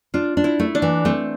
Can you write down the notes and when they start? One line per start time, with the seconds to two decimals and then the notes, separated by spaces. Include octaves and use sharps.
0.14 D4 F4
0.37 D4
0.44 E4
0.60 A3
0.75 D4
0.82 E3
1.05 A3 C4